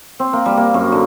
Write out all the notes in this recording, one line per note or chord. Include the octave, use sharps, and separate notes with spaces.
C4
A#3
G3
A#3
F#2
D3